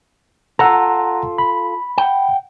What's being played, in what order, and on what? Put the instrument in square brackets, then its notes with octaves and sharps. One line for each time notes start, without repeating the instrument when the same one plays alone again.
[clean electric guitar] F4 A4 [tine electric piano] F#5 A#5
[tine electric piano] B5
[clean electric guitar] F#5 G5